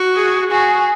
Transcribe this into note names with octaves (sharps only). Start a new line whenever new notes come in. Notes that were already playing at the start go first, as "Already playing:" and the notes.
Already playing: F#4
G#4
F#4 G#4